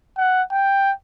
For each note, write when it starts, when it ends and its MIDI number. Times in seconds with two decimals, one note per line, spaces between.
0.17 0.42 78
0.52 0.92 79